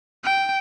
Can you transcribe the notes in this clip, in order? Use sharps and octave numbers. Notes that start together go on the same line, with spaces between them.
G5